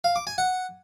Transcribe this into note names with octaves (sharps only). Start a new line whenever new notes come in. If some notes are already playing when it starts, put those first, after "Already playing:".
F5
D6
G#5
F#5